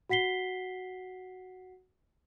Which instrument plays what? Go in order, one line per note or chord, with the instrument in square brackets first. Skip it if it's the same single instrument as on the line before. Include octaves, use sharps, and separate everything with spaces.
[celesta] F#4 F#5 B6 C7 G7